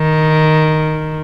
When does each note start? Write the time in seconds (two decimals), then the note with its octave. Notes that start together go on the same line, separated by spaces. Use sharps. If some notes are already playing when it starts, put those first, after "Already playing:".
Already playing: D#3